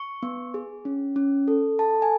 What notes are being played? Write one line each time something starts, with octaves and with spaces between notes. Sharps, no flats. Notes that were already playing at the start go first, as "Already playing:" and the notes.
Already playing: C#6
B3
G#4
C#4
C#4
A4
A4 A5
G#5